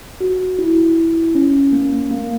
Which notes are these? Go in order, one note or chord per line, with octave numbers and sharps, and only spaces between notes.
F#4
E4
C#4
A#3
A#3